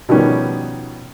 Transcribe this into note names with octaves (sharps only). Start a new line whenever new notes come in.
B2 D#3 F3 G3 B3 C#4